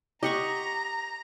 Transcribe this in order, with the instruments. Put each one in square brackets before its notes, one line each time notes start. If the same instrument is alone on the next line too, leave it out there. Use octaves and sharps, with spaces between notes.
[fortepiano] G4 [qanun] D#5 F#5 C#6 [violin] A#5